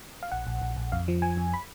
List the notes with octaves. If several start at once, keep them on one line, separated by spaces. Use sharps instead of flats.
F5
A#1 F#5
A#1
A#1
A#1
F2 F5
F3
F3 G#5
F2
B5